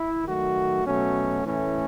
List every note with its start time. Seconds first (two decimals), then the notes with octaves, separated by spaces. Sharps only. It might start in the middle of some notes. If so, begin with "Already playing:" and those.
Already playing: E4
0.24 D#3 F#3 A3 F#4
0.85 B2 F#3 A3 C#4
1.45 A2 E3 A3 C#4